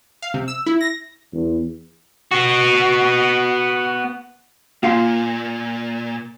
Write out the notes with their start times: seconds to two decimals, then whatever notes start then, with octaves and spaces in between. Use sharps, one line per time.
0.22 F5
0.34 C3
0.48 E6
0.66 E4
0.81 A#6
1.33 E2
2.31 B3 F#4
4.83 A#2 A#3 F4 F5 C6